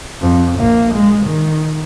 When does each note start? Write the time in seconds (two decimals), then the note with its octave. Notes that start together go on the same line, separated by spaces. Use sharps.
0.21 F2
0.60 A#1 A#3
0.94 G#3
1.26 D#3